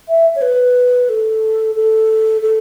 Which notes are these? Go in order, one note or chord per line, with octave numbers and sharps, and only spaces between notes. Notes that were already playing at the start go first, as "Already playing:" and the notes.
E5
C#5
B4
A4
A4
A4